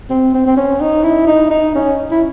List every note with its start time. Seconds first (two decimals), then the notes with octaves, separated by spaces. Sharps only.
0.10 C4
0.35 C4
0.47 C4
0.57 C#4
0.81 D#4
1.04 E4
1.27 D#4
1.50 D#4
1.75 C#4
2.11 E4